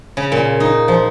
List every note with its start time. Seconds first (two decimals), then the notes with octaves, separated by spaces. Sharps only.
0.17 C#3
0.32 A#2
0.60 D#4
0.88 F3